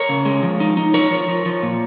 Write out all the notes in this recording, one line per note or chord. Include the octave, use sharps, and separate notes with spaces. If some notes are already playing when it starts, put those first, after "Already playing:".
Already playing: A#4 C#5
C#3
G#3
F3
D#4
D#4
F3 A#4 C#5
F3
F3
F3
A#2